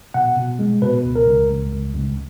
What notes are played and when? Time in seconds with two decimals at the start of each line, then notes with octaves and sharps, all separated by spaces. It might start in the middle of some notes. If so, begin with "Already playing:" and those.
0.14 B2 F#5
0.37 B2
0.59 G#3
0.82 B2 B4
1.05 C#2
1.16 A#4
1.27 C#2
1.50 C#2
1.72 C#2
1.95 C#2